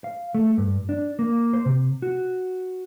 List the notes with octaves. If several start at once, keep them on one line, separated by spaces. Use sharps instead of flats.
F5
A3
G2
D4
A#3
C5
C3
F#4